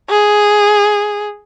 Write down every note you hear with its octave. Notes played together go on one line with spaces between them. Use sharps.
G#4